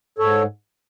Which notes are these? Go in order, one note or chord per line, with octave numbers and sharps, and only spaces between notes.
G#2 A4 C#5